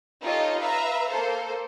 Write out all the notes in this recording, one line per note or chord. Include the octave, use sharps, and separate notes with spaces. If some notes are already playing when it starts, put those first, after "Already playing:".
D#4 F4 G4 A4 C#5 D#5
B4 E5 F5 A#5
A#3 A4 C5